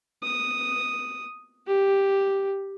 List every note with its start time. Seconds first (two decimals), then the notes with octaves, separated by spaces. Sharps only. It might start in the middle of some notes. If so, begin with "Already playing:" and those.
0.23 D#6
1.67 G4